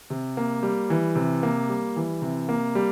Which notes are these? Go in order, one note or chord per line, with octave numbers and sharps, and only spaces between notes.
C3
A#3
G3
E3
C3
A#3
G3
E3
C3
A#3
G3